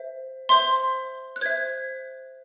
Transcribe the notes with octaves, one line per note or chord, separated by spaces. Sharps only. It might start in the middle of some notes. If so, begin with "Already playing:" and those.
Already playing: C5 E5
C5 E5 C6
F#6
C5 E5 G#6